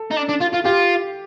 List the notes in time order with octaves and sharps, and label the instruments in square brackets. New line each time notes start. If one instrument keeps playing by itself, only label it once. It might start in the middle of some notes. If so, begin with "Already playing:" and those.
Already playing: [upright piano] A4
[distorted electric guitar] D#4
D4
D4
F4
F4
[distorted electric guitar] F4 [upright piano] G4